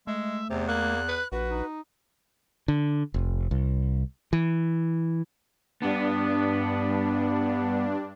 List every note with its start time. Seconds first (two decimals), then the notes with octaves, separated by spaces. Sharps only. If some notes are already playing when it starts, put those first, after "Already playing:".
0.07 G#3 A3 E5
0.50 E2 C3
0.68 A#3 F#6
1.08 B4
1.32 A#1 F#4 B4
1.51 D#4
2.68 D3
3.14 F1
3.51 C2
4.33 E3
5.82 G2 B3 D4